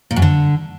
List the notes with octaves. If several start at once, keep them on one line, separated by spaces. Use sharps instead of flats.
A#2
F#2
D3